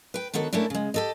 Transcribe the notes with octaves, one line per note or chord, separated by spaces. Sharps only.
B4 G5
D3 D#3 B3 F#4 A4 C#5
A3 A#3 C#4 D4 E4
C#3 G#3
G4 A4 D#5